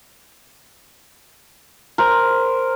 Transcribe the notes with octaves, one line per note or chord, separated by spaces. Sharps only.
A#4 C5